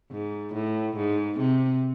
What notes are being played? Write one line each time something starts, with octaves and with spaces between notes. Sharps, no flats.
G#2
A2
G#2
C3